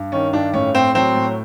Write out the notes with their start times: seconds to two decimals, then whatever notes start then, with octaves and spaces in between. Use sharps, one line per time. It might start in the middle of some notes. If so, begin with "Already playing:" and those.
Already playing: G2
0.12 D#3 C#4
0.33 G2 D4
0.54 A2 C#4
0.74 A2 C4
0.95 F#3 C4
1.15 A2